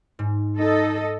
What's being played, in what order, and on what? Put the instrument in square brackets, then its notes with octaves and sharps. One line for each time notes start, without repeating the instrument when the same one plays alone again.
[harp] G#2
[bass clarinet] D#4 [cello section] A4 D#5